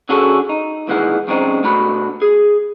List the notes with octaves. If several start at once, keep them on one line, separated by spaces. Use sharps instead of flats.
D3 C#4 F#4 G#4 A4
D#4
C2 A#2 D#3 E3 G#3 F#5
F#2 C#3 G#3 C4 D4 D#4
B2 A3 D4 F#4 B5
G#4